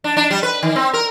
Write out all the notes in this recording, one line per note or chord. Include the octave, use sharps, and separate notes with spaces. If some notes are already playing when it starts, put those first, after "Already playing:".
D4
D4
G3
B4
D#3
C4
A#4